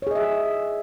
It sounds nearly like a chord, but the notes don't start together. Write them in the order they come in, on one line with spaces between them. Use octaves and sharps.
C#5 G#4 D#5 E5